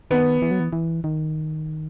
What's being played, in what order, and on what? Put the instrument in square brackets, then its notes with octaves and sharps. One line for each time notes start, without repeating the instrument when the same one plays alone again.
[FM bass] D#3 [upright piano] B3
[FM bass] E3
F#3
E3
E3
D#3